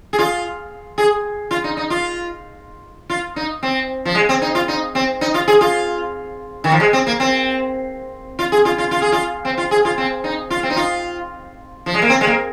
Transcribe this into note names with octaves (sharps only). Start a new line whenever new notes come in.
G#4
F4
G#4
F4
D#4
D#4
F4
F4
D#4
C4
F3
G#3
C4
D#4
F4
D#4
C4
D#4
F4
G#4
F4
D#3
F3
G#3
C4
A#3
C4
F4
G#4
F4
F4
F4
G#4
F4
C4
F4
G#4
F4
C4
D#4
F4
C4
D#4
F4
F3
G#3
A#3
C4
G#3
A#3